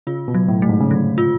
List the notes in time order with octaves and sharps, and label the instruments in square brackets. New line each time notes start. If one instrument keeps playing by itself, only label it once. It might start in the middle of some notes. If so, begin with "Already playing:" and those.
[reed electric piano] C#3 [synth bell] F4
[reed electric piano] B2
[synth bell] F#3
[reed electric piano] A2
[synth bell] A3
[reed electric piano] G#2
C#3
[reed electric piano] D3 [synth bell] F#3
[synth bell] F4